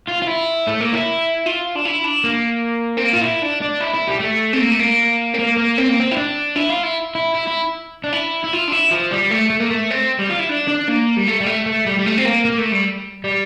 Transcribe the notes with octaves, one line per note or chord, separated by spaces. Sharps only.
F4
F4
E4
A3
A#3
E4
F4
D4
E4
D4
A#3
C4
A#3
F4
E4
D4
D4
E4
E4
G3
A3
C4
A#3
A3
A#3
C4
A#3
A#3
C4
A#3
C4
E4
D4
E4
F4
E4
E4
E4
E4
D4
E4
E4
F4
D4
E4
F3
G3
A3
A3
A#3
A3
C4
G3
F4
E4
D4
D4
A#3
G3
A3
G3
A3
A3
G3
G3
A3
C4
A#3
A#3
A3
G3
G3